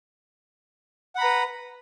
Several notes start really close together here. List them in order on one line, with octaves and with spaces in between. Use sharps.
F#5 B5 A#5 B4